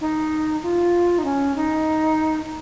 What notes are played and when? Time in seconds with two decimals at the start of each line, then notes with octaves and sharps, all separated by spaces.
0.01 D#4
0.63 F4
1.18 D#4
1.25 C#4
1.56 D#4